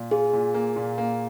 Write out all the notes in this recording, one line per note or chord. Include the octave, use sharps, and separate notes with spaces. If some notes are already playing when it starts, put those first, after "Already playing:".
Already playing: A#2
F4 G#4
A#2
A#3
A#2
A#3